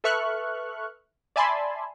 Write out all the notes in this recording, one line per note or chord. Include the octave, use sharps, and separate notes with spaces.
A4 B4 E5 C#6 F6 F#6
D5 E5 G#5 A5 B5 C6